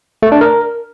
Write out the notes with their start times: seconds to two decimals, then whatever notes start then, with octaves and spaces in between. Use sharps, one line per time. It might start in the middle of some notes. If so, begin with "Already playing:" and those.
0.23 A3
0.32 D4
0.41 A#4